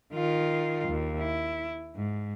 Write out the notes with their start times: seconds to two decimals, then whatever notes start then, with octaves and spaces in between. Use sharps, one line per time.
0.14 D#3 F4
0.89 D#2
1.20 E4
1.95 G#2